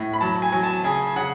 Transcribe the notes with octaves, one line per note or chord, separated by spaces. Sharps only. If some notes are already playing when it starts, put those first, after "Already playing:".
Already playing: A2
B5
F#3 A5
G#5
F#3
A5
C#3 G#5
C#3 F#5